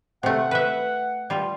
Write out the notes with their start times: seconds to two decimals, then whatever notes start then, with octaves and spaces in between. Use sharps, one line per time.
0.23 C3 A3 F#5
0.51 B4 E5
1.30 G3 F4